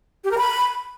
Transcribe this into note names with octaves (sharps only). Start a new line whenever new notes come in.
G4
A#4
B5